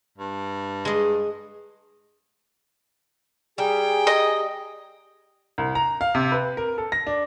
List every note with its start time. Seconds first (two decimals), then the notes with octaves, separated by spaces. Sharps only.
0.18 G2
0.85 G#3 D#5
3.58 G3 G#4 G5 G#5 A#5
4.07 D#5
5.58 C2
5.75 A#5
6.01 F5
6.15 C3
6.32 B4
6.57 A#4
6.78 A4
6.92 A#6
7.07 D4